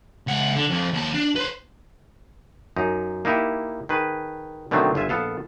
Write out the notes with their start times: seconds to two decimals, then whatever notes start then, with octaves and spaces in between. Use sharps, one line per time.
0.27 C#2 F#5
0.56 D3
0.70 F2
0.93 D#2 A5
1.14 D4
1.36 B4 C5
2.76 F#2 D#4
3.25 A#3 D#4 E4 G4
3.89 D#3 G#4 B4
4.71 B2 D3 D#3 F#3 A3 C4
4.95 G1 F4 E5 G#5
5.09 A#1 B3 A4 F5